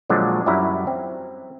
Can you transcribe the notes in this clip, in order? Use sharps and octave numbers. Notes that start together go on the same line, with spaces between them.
A#2 D3 F3 F#3 G#3 D4
F#2 F#3 G3 E4 A#5
C4